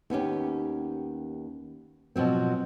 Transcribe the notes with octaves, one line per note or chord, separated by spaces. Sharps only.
D#2 B3 C#4 G4
B2 F3 F#3 C4